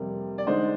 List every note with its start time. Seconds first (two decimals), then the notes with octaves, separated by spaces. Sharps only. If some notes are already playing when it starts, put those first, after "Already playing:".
Already playing: F2 C3 G3 A#3
0.38 D5
0.47 D3 G#3 D#4 C5 D#5